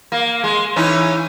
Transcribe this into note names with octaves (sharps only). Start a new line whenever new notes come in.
A#3
G#3
E3 C#4 D#4